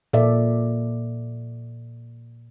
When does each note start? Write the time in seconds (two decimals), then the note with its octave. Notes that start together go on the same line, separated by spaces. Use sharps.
0.13 A#2 A4 D5 E5